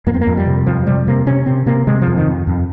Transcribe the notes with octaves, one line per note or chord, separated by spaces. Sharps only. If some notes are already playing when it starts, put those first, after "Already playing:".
F2 A#3
C4
A#3
F2
G3
C3
F2 F3
C3 G3
C3 A#3
C3 C#4
C3 C4
C3 A#3
C3 G#3
F3
F2
D#3
F2
F2